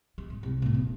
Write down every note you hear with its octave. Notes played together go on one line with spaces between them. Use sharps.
G#3
G#2
C2
A2 B3
D#1